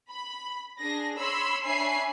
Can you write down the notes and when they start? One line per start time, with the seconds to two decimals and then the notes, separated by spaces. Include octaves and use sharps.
0.11 B5
0.79 D4 G#4 A#6
1.18 C#5 B5 C6 E6
1.65 D4 C#5 E5 G#5 B5 C7